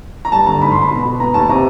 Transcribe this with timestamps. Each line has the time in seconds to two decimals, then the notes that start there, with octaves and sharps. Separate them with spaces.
0.25 A#5
0.32 G2 A5
0.46 D3 A#5
0.62 G#2 B5
0.72 G#2 C6
0.82 B5
0.91 B2
1.05 B2
1.20 B3 A#5
1.34 D#2 A5
1.49 C3 A#5